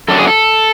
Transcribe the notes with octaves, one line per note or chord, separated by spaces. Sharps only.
F#2 D3 F#3 A4
G#4
A4